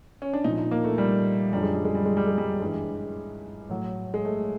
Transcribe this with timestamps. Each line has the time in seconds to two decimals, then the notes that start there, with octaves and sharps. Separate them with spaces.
0.22 C#4
0.33 D4
0.44 A#2 F3 D#4
0.58 D#4
0.71 A#3
0.84 A3
0.98 G3
1.53 F#2 D3 F3 G3
1.63 G#3
1.74 G3
1.85 G#3
1.95 G3
2.05 G#3
2.17 G3
2.27 G#3
2.38 G3
2.61 G2 E3 G#3
3.69 A2 F#3
4.14 G#3
4.25 A3